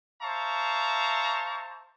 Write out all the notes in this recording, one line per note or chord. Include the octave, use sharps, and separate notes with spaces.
C5 E5 F5 A5 A#5 C#6